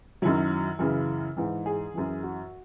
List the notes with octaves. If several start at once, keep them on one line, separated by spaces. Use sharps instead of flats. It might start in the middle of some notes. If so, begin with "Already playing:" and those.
F#2 D#3 F#3 E4
F#2 C#3 E3
G#2 E3
G#4
F#2 E3
F#4